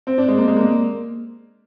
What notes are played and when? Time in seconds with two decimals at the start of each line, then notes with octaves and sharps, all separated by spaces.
0.07 C4
0.18 D4
0.28 G#3
0.37 A#3
0.48 G#3
0.57 A#3